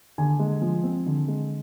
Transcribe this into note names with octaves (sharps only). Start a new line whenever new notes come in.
D3 G#5
G#3
F3
C4
D3
G#3